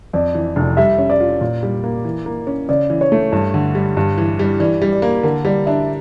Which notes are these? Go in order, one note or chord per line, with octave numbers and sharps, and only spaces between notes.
F2 D5
E3
F1
G3 E5
C#4
D5
F4
A#2
G3
A#3
E3
A#3
C#4
C#3 D5
E3
C#5
A3
G2
D3
G3
G2
E3
G3
E3 D5
G3
D5
A#3
D3 A#4
G3 D5
D4 E5